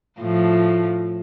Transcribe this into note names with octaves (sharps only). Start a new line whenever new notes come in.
A2 F3